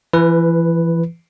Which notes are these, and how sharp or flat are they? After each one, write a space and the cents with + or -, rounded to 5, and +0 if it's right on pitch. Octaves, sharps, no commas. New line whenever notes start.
E3 +30 B4 +0